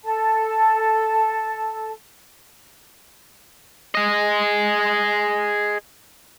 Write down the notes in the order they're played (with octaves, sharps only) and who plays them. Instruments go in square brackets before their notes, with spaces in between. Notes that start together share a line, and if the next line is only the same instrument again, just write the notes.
[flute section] A4 A5
[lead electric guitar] G#4 D#5